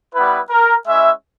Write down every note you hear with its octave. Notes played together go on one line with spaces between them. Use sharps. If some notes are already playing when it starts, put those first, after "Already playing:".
G3 B3 E4 B4
A#4
G#3 C#4 E4 E5